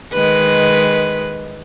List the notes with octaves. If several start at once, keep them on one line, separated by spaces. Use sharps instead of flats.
D#3 G#3 B4